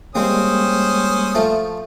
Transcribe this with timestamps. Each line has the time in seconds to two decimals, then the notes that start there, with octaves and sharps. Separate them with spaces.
0.15 G3 G#3 A#3 C4 C#4 C5 D#6
1.35 F3 A3